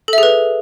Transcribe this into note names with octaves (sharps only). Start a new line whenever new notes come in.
G#4 A4 B4 E5